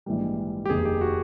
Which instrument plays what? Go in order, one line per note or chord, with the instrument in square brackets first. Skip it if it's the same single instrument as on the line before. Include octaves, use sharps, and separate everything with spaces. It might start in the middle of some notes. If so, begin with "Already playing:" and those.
[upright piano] A#1 G#2 E3 G3
[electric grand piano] G4
[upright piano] F1 D#2 D#3 [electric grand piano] G#4
[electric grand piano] G4
F#4